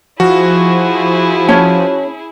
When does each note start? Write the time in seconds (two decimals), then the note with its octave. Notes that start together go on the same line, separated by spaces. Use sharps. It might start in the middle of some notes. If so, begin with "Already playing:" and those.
0.20 F3 E4 F#4 G#4
1.49 C#4 C#5 A5